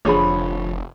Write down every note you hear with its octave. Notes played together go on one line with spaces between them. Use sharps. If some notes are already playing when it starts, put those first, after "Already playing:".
F1 D3 F3 D4 G#4 C#5 B5